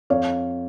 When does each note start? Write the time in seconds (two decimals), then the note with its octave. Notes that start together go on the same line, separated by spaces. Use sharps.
0.10 F2 C#5 F5